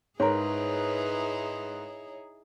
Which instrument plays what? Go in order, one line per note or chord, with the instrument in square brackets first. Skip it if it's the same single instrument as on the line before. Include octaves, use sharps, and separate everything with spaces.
[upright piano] G#2 A#4 [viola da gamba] D#4 E4 G#4 [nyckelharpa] B4 [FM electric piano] C#5 A#5